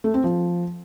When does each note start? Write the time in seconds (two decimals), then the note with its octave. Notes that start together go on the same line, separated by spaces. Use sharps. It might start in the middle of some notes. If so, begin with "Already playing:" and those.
0.04 A3
0.14 C4
0.24 F3